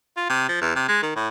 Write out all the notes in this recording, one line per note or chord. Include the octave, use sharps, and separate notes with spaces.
F4
C3
F3
E2
C3
G#3
D#3
A2